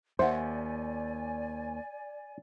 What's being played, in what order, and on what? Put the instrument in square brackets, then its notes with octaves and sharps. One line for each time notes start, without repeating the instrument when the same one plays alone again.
[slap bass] D#2 [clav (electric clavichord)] C5 [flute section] D5 G#5 [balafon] E5 F#5